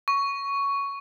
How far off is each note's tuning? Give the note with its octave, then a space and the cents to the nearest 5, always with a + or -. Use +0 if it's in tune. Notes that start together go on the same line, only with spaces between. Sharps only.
C#6 +10